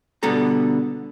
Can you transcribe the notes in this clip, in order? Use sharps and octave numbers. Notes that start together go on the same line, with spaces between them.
B2 D3 G3 B3 A4 A#5